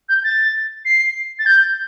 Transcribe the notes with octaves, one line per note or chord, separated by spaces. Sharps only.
G6
A6
C7
A6
G6